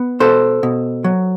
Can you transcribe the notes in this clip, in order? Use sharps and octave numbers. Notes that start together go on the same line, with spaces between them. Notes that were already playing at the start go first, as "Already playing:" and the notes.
Already playing: B3
B2 A4 C5
B2
F#3